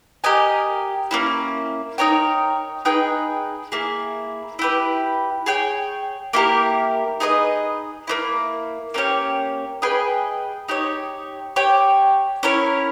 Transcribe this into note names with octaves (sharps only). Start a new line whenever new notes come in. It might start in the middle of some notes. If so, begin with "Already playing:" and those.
G4 A#4 D#5 G#5
A#3 C#4 E4
D#4 A#4 C#5 G5
D#4 G#4 B4 G5
A#3 E4 G#4
E4 G4 B4
G#4 C#5 G5
A#3 E4 G4 A#4
D#4 G#4 B4 D#5
A#3 C#4 E4
A#3 C#4 G4 C#5
G#4 B4 D#5 G5
D#4 G4 C#5
G4 C#5 G5
C#4 E4 A#4 C#5